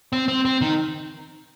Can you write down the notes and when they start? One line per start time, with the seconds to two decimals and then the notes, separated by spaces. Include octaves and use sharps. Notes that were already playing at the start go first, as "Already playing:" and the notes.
0.13 C4
0.28 C4
0.45 C4
0.61 D#3